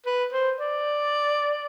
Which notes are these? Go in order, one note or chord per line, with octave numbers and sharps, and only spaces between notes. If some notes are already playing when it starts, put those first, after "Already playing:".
B4
C5
D5